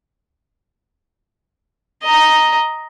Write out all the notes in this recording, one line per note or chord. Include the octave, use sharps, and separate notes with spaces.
D#5 A#5